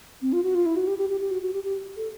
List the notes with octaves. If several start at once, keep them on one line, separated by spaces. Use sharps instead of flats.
C4
F4
F#4
F4
E4
F#4
G4
G4
G4
G4
F#4
F#4
G4
G4
A4